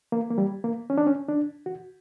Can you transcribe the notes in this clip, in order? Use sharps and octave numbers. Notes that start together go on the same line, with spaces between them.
A#3
A#3
G3
A#3
C#4
D4
C#4
D4
F#4